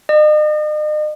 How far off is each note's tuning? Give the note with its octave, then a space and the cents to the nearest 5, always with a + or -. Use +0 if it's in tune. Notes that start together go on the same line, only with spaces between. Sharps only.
D#5 -40